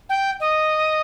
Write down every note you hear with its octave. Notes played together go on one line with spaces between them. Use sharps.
G5
D#5